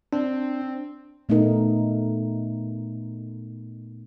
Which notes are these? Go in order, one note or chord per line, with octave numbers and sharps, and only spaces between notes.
C4 D4
A#2 A3 B3 D#4 A#4